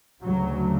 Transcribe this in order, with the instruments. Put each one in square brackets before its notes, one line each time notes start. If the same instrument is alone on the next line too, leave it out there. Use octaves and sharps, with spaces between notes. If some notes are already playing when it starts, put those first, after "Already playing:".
[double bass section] D2 C#3 F#3